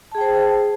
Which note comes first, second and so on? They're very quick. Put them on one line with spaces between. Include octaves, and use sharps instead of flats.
A5 G#4 G5 C5